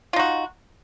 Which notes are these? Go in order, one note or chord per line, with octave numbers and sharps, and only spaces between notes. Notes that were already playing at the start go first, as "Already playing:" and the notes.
D#4 F4 F#4